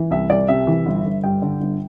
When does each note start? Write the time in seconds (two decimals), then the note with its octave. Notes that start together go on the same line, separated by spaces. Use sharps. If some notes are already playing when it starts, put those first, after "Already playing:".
Already playing: E3
0.11 C2 E5
0.30 C2 D5
0.48 C3 E5
0.67 E3
0.86 G1
1.05 G1
1.24 G2 G5
1.42 D3
1.61 G1